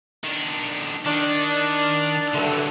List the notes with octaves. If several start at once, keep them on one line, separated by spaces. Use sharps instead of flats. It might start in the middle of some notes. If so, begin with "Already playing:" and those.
D#3 D4
D#3 D4
G2 D3 F#3 A3